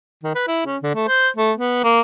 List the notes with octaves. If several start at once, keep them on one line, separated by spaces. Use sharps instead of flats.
D#3
B4
E4
C#4
D3
A3
C5
A3
B3
A#3